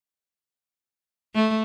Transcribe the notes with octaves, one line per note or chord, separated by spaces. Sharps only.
A3